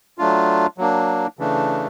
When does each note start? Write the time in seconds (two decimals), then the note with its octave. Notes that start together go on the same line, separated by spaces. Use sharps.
0.18 F#3 A3 D4 F4
0.78 F#3 A#3 D4
1.39 C#3 E3 A3 D4